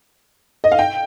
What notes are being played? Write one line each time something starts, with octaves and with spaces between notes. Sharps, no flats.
D#5
F5
G5